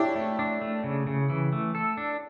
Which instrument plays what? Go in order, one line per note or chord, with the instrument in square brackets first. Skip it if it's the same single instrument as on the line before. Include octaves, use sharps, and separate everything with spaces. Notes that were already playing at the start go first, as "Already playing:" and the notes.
Already playing: [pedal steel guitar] D4 [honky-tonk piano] E4 G4 C#5
[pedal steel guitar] A3
D4
A3
C#3
C#3
E3
A3
A4
D4